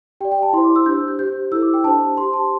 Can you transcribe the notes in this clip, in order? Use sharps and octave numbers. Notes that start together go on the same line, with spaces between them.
G4 D5 G5
G5
A5
E4 C5 C6
D6
E6
D4 G4 C5 G6
G6
G4 C5 G6
E4 A4 C5 E6
D6
G5
D4 G4 C5 A5
G4 C5 C6
A5